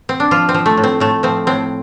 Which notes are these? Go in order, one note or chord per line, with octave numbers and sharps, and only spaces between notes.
C4
D4
F3 F4
C4
F3
A3
A2
C4
A2 A3
F3 C4
A2 C4